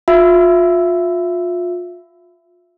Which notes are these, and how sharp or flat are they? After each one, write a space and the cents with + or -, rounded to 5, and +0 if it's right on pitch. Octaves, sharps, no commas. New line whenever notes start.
F4 +30 E5 +15 E6 +0